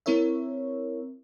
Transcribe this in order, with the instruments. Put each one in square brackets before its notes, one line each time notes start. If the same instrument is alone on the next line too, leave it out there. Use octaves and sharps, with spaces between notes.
[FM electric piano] C4 E4 A#4 C#5 E5